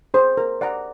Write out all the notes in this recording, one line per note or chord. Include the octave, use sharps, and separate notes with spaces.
G#4 C5
A#4
D5 F#5 A#5